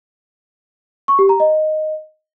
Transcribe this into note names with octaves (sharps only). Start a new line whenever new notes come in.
C#6
G4
A#5
D#5